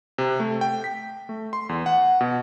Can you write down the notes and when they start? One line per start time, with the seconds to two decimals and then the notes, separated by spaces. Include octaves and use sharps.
0.18 C3
0.40 A3
0.61 G5
0.84 B6
1.29 A3
1.53 C6
1.69 E2
1.86 F#5
2.21 B2